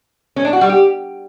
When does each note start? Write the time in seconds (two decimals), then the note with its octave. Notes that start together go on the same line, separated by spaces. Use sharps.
0.36 C#4
0.45 D4
0.53 F#4
0.61 G3
0.69 G4